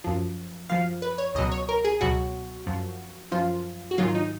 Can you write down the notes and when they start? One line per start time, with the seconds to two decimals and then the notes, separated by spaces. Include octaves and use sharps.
0.04 F#2 F3
0.69 F#2 F3 F5
1.02 B4
1.18 C#5
1.35 C#2 B2 F#3 D#5
1.51 C#5
1.69 A#4
1.84 G#4
2.01 C#2 B2 F#3 F#4
2.66 F#2 F3
3.31 F#2 F3 F4
3.91 F#4
3.98 G#2 D#3 F#3 F4
4.15 D#4